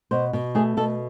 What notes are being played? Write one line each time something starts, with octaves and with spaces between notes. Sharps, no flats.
B2 C5
B2
A3 G#4
B2 A4